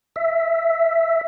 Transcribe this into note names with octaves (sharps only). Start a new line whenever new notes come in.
E5